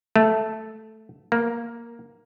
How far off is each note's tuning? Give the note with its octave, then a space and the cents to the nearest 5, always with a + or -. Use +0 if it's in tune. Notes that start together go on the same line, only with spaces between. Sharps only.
A3 -5
A#3 +5